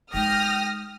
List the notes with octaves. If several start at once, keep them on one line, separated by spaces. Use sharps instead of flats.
G#3 D#4 G5 D#6 F6 A#6